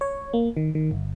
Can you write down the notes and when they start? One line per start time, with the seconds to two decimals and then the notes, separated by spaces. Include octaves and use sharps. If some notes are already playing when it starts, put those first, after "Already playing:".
0.01 C#5
0.33 A#3
0.57 D#3
0.75 D#3
0.91 G1